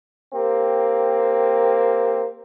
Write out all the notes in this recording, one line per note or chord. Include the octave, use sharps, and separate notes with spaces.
A#3 C4 G4